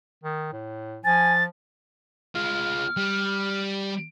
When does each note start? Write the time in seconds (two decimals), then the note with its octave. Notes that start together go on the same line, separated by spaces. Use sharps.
0.24 D#3
0.53 A2
1.05 F3 G#5 A6
2.35 G#3 F4 F6
2.97 G3